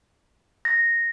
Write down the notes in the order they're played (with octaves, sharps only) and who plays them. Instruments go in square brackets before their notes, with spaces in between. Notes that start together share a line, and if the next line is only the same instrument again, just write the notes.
[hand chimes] A#6